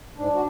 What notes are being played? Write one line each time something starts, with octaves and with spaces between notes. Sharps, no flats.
G#2 D4
F#4